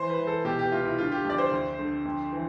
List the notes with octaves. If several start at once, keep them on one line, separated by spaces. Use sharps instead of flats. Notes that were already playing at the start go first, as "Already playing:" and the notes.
Already playing: E3 C5
B4
E3
A4
B2 G4
G4
C2 F4
E4
D3 F4
G4
F2
D5
C5
D2
D3
F2
E3